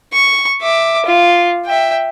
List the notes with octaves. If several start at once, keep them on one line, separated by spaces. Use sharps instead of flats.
C#6
E5 D6
F4
E5 G5